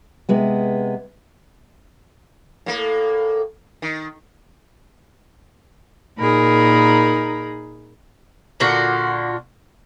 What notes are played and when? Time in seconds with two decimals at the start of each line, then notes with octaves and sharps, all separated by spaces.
0.29 C3 G#3 B3
2.66 A2 A#3
3.82 D#3
6.20 A#2 D#4 G#4 A#4 B5
8.60 A#2 D3 F4 F#4